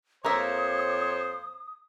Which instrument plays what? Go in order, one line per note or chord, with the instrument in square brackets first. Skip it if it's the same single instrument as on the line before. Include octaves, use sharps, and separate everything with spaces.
[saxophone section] F2 C#5 [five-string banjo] A#3 A#4 E5 [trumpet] C5 [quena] D#6